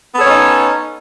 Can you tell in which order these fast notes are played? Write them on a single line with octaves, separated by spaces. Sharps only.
B3 A4 C#5 C#4 D#4